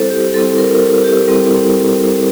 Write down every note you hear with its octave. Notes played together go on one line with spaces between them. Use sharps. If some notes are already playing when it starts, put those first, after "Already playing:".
Already playing: G3 C4 E4 A4 C5
G4
G3 C4 E4 A4
A#4
A4
G4
G3 C4 E4